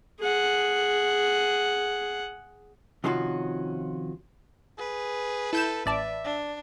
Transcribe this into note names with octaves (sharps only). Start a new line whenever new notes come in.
G#4 F#5
C3 D#3 F3 C#4 F4 F#4
G#4 B4
E4 A4 G6 E7
A1 D5 E5 A5
D4